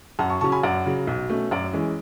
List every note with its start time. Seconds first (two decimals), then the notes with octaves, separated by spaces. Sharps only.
0.19 F#2 F#5 A5
0.30 A5 C#6
0.41 C#3 A5 C#6
0.44 F#3 C#4
0.52 G#5 B5
0.63 F#2 D5 F#5
0.86 C#3 F#3
1.07 B1
1.29 B2 A3 C#4
1.51 F#2 D5
1.73 E3 G#3 C#4